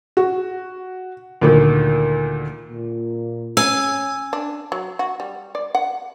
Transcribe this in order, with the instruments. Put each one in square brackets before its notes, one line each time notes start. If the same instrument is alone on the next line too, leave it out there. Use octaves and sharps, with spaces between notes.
[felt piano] F#4
D2 A#2 D#3
[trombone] A#2
[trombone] C#4 [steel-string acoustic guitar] G#5 [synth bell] E6
[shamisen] D4
F#3
F#4
G3
D5
F#5